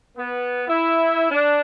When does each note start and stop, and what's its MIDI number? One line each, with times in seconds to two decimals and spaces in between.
0.17 0.63 59
0.67 1.27 64
1.30 1.61 62